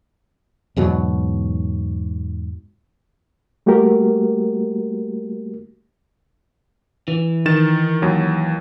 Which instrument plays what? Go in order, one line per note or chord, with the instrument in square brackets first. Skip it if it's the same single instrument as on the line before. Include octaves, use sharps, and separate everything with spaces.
[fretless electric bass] E2 G#2 B2 F#3
[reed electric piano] G3 A3 A#3 F#4 G4 A#4
[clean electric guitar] E3
[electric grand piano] D#3 A6 E7
D#2 F#3